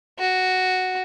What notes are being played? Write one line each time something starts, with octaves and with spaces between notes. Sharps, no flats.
F#4